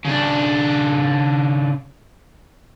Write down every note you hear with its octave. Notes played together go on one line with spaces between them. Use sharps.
C#3 D4